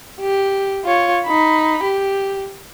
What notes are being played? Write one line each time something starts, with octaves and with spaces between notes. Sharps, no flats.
G4
F4 C#5
D#4 B5
G4